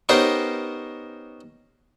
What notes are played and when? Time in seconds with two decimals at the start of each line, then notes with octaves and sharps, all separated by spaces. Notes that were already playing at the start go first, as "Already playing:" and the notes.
0.09 B3 C#4 D#4 G4 A#4 C5